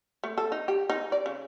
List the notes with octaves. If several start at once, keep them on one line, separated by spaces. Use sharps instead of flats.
A3
A4
D#4
G4
D#4
D5
C#3